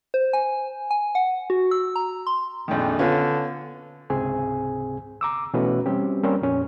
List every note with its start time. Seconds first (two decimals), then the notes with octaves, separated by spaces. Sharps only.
0.14 C5
0.33 G#5
0.91 G#5
1.15 F#5
1.50 F#4
1.71 E6
1.96 A#5
2.27 C6
2.68 A#1 F2 D#3
2.99 D3 B3 C#4 F4
4.10 C#2 G#2 C3 C4 G#4 G#5
5.21 A#5 D6 E6
5.54 B2 E3 A3 C#4 F#4 B4
5.86 G3 C4 C#4 G4
6.24 G3 A#3 C4 C#4 A#4 C5
6.42 F2 A#2 C#4